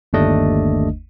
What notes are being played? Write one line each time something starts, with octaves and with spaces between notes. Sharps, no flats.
G1 D#2 A3 D4 D#5